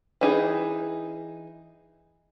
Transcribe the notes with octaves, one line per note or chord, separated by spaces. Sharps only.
E3 D#4 G#4